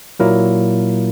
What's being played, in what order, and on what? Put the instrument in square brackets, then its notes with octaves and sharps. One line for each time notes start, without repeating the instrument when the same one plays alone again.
[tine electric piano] A#2 F#3 A#3 E4 A#4